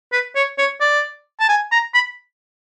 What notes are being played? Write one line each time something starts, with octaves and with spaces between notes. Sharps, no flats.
B4
C#5
C#5
D5
A5
G#5
A#5
B5